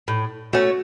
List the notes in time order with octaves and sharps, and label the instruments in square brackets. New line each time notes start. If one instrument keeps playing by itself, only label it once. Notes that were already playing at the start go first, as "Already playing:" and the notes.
[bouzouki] A2
[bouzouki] A3 C#4 [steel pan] F#4